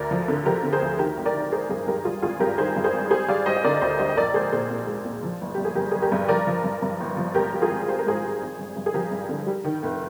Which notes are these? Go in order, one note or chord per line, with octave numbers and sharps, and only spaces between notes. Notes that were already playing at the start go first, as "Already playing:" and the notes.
Already playing: D2 A#4 D5
F3
D3
F3 G4 A#4
D3
G#4 C5
D2
D#3 G4 A#4
G#1
A#4 D5
D#3
G#3 G#4 C5
G2 G#4 C5
G2 G4 A#4
G3 F4 G#4
G#1 F4 G#4
G2 G4 A#4
D#3 G#4 C5
G2
G#4 C5
G#1
G3 G#4 C5
G3 D5 F5
G3 C5 D#5
D#5
D3 A#4 D5
D2 C5 D#5
G3 C5 D#5
D#5
A#1 A#4 D5
G#3 G#4 C5
A#2 G#4 C5
A#2
G#3
A#2
F3
G1
G2 G4
G#4
G1 G4 A#4
G1 G#4
G4 A#4
G2
F3 A#4 D5
F3
G2
G2
G1
F3
G#1 G4 A#4
G3
F4 G#4
G#1
G3 C5
A#4
G#2 G#4 C5
G3
G#1
G2
G2
G#4
F3 G4 A#4
G2
D3
G3
D#3
F1